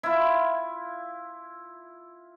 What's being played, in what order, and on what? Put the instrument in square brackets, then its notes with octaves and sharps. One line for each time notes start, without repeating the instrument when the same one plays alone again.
[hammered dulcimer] E4 F4